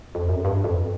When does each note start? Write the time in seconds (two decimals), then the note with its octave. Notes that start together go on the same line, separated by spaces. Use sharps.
0.15 F2
0.29 F#2
0.45 G2
0.64 F2